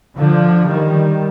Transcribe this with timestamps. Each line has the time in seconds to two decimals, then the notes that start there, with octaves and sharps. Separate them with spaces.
0.17 D3 F3
0.70 D#3 G3